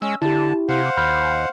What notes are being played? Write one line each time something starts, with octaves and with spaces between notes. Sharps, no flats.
G#3 C#4 E6
D3 E4 G4 A5
C3 C5 F5 F#5
D#2 B5 F6 G6